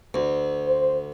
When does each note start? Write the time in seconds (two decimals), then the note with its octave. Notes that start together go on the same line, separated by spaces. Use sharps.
0.14 D2
0.67 C5